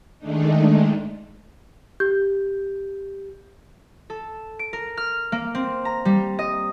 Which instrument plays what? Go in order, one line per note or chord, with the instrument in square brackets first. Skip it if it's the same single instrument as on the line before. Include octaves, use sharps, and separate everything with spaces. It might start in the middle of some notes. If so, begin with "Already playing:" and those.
[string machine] D#3 G#3 A3 D4 D#4
[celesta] G4 G6
[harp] A4
D7
A#4
F6
A#3
C4
A#5
G3
D#5